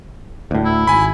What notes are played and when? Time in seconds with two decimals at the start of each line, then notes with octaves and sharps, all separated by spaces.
0.51 D2 A2
0.65 E4
0.87 G#1 G#5 B5